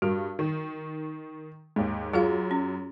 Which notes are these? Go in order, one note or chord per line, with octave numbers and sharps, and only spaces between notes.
G2 F#4 A#4
D#3
D#2 G#2
F#2 F4 G#4 F5
C#4